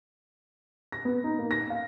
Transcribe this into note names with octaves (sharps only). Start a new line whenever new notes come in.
A#6
B3
D#4
A#3
A#6
F5